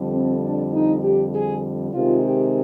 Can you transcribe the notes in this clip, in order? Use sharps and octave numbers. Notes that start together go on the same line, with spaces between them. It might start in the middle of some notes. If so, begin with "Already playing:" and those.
Already playing: F2 D3 G3
C4
D4
D#4
G4
G#4
C3 D#3 G#3 F4
G4